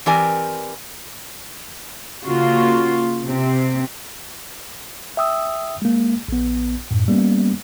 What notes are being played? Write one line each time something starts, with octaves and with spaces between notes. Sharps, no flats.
E3 C4 G4 A#4 D5 G#5
C#3 A#3 F4 F#4
C3 C4
E5 G5 D#6 E6
G#3 A#3
A#1 B3
F#2 A2
G3 A#3 B3 C#4